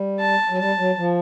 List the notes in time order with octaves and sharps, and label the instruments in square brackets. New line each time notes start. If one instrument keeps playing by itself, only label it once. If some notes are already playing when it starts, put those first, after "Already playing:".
Already playing: [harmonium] G3
[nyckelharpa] A5
[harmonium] F#3
[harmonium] G3 [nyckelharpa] A5
[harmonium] F#3
F3